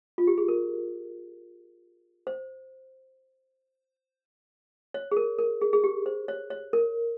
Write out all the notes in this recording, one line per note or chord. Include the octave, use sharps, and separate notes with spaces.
F4
G4
G#4
A#4
C5
C#5
G#4
A#4
A#4
G#4
G#4
G4
C5
C#5
C#5
A#4